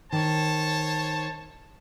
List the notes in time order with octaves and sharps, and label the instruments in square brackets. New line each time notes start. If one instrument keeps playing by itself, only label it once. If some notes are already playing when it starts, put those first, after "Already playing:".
[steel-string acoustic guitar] D#3 [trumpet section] C5 C#5 A5